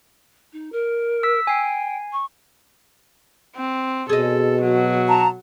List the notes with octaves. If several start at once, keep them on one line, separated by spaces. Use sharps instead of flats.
D#4
A#4
E6 B6
G5 G#5 C7
C#6
C4
B2 G#4 A4 D#5
F#3
A5 A#5